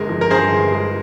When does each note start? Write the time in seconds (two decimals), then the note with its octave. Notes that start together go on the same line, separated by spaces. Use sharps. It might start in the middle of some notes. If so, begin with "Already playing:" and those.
Already playing: G1 G#3 A#4
0.09 F3
0.21 A#4
0.30 G2 G#4 C5
0.52 G1
0.72 G#3